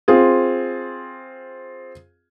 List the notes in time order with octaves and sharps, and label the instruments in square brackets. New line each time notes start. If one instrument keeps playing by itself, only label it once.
[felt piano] C4 F4 G#4